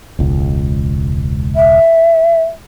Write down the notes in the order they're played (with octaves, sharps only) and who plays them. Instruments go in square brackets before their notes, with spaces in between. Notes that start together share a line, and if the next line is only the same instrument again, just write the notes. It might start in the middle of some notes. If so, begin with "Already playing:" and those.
[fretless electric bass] E1 C#2
[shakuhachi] E5